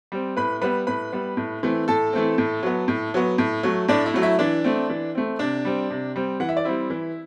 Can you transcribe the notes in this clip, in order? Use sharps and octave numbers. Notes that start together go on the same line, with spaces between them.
G3 C4
A2 B4 B5
G3 B3 B4 B5
A2 B4 B5
G3 B3
A2
E3 A3 C4
A2 A4 A5
E3 A3 C4
A2
F#3 B3
A2
F#3 B3
A2
F#3 A3
A2 D4 D5
E4 E5
F#3 A3
E4 E5
E3 D4 D5
A3 C4
E3
A3 C4
C3 D4 D5
G3 C4
C3
G3 C4
E3 F#5
E5
D5
G3 C4 E4 E5
E3